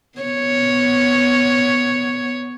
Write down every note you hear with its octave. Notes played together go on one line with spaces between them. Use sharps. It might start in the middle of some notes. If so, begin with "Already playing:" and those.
B3 C#5